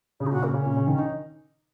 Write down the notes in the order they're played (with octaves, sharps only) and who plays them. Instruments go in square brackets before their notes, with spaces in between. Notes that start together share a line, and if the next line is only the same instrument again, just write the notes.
[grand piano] C#3 [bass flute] G#4
[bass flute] D#4
[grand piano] A#2 [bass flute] F#4
[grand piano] C#3 [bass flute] A#3
[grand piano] C#3 [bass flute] C#4
[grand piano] A#2
C#3
D#3
D#4